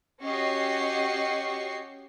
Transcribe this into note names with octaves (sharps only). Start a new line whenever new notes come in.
C#4 F#4 G4 D#5 C#6 C7